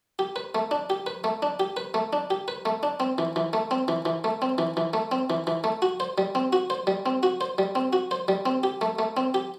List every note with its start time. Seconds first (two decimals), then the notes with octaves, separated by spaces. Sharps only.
0.19 G4
0.36 B4
0.55 A3
0.71 D4
0.90 G4
1.07 B4
1.24 A3
1.42 D4
1.60 G4
1.77 B4
1.94 A3
2.13 D4
2.30 G4
2.48 B4
2.66 A3
2.83 D4
3.00 C4
3.18 E3
3.36 E3
3.53 A3
3.71 C4
3.88 E3
4.05 E3
4.24 A3
4.42 C4
4.58 E3
4.77 E3
4.93 A3
5.12 C4
5.30 E3
5.47 E3
5.64 A3
5.82 F#4
6.00 C5
6.18 G3
6.35 C4
6.53 F#4
6.70 C5
6.87 G3
7.06 C4
7.23 F#4
7.41 C5
7.58 G3
7.75 C4
7.93 F#4
8.11 C5
8.28 G3
8.46 C4
8.63 G4
8.81 A3
8.99 A3
9.17 C4
9.34 G4